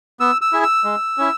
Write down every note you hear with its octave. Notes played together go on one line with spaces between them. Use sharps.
B3 E6
E6
E4 G#4
E6
G#3
C#4 E4